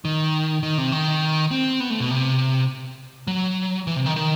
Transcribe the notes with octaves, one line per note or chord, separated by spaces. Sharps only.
D#3
D#3
C3
D#3
C4
B3
A3
B2
C3
F#3
E3
C3
D#3
D#3